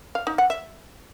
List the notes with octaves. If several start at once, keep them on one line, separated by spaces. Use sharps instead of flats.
F5
D#4
F#5
E5